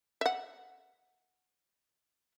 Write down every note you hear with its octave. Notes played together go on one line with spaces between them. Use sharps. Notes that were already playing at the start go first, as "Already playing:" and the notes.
E5 F#5